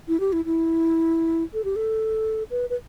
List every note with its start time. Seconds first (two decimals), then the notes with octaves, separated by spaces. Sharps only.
0.08 E4
0.20 G4
0.33 E4
0.45 E4
1.54 A4
1.64 G4
1.76 A4
2.51 B4
2.70 B4